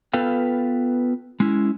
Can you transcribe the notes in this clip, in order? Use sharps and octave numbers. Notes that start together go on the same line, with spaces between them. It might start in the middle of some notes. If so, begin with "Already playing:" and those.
B3 F4 A4 B4 F5 G5
G#3 C#4 E4